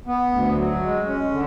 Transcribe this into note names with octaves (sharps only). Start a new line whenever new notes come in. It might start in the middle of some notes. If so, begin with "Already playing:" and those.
B3
D2
F#3
G#3
C#4
D3